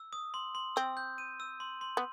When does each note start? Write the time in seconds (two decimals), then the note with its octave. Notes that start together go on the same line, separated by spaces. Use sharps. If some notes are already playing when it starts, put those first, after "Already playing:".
Already playing: E6
0.13 D#6
0.34 C6
0.55 C6
0.76 C4 E6
0.97 G6
1.18 D#7
1.40 E6
1.60 C6
1.81 C6
1.97 B3